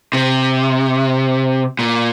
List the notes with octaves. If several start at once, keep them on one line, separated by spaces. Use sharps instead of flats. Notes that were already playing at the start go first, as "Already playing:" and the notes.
C3
A#2